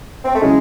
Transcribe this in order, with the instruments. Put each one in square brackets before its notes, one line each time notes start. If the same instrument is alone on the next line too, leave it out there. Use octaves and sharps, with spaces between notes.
[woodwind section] C4
A3
[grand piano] C#3 F#3 C#4 E4 [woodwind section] G#3